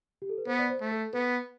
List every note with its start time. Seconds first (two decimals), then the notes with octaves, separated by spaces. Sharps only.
0.22 G4
0.29 A4
0.38 B4
0.47 B3 C5
0.59 D5
0.70 C5
0.81 A3
0.91 A4
1.13 B3 B4